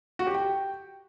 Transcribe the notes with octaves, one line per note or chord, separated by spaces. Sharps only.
F#4
G4
G5